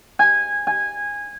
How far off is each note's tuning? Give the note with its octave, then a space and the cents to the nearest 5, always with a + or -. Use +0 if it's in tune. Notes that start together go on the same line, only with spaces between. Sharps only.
G#5 -15
G#5 -15